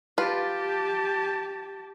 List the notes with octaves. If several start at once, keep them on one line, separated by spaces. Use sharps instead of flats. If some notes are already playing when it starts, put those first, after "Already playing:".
F4 G4 B4 A5